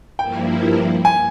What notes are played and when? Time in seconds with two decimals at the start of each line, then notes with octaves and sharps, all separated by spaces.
0.19 G2 F3 A#3 E4 G5
1.05 G#5